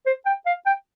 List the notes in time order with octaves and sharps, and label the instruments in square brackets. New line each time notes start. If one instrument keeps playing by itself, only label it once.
[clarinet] C5
G5
F5
G5